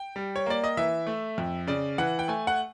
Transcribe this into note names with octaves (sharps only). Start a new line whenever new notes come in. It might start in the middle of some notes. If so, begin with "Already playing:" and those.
Already playing: G5
G3
C#5
A#3 D5
D#5
E3 E5
A3
F2
C#3 D5
E3 F#5
G5
A3 G#5
F#5